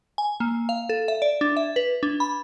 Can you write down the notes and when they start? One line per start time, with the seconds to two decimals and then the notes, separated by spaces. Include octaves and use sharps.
0.18 G#5
0.40 A#3
0.69 F5
0.89 A4
1.08 E5
1.22 D5
1.41 D4
1.57 E5
1.76 B4
2.03 D4
2.20 B5